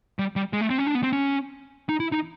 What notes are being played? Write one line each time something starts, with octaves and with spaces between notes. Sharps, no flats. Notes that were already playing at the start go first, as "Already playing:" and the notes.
G3
G3
G#3
A3
C4
C#4
D4
B3
C4
C#4
D#4
E4
D#4